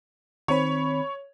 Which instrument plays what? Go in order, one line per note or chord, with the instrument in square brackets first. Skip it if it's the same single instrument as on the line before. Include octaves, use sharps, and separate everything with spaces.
[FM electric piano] D#3 C4 B5 [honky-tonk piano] C#5